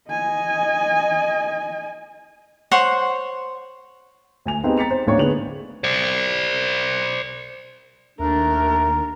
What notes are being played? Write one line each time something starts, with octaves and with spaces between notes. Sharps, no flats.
D#5 G#5
C5 C#5 F#5 C#6
D2 G#5 F7
B3 C4 D#4 G4 G#4
A#5 A6 B6 C#7 F7
C5
D1 A1 A#3 D4 C#5 C#6
D3 B3 G#4 F7 F#7
C5 D5
D#2 A3 D4 A#4 A#5